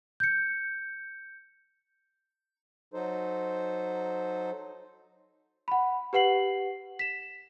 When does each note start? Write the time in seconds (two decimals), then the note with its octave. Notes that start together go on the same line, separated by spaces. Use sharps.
0.20 G6 C#7
2.94 F#3 D#4 A4 C5
5.68 F#5 B5
6.13 G4 B4 F#5 C7 F#7
6.99 B6 E7